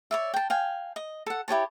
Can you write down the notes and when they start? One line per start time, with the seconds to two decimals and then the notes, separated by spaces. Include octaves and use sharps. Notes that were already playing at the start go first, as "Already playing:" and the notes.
0.11 C#5 D5 E5
0.34 G5 A5
0.50 F5 G5 G#5
0.96 D#5
1.26 A4 F#5
1.48 E4 G4 C#5 A5